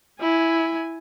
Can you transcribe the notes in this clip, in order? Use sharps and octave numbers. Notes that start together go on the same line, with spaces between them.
E4 G#5